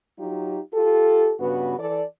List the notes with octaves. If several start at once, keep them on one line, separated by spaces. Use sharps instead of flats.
F#3 D#4 F4 G4
F4 G4 A4
G2 C#3 B3 F#4 B4
E3 A4 D5